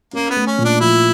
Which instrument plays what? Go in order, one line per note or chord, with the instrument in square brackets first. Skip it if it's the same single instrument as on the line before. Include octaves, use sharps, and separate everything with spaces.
[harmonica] A#3 [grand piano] C#4
[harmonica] B3
[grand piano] A3
[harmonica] C#4
[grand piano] A#2
[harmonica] D4
[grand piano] F3 [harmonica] E4